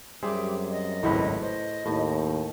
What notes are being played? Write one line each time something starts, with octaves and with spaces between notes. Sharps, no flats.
F#2 G3 C4 G4 G#4 E5
D#5
G#1 C#2 A2 E4 B4
C5 D#5
D#2 A2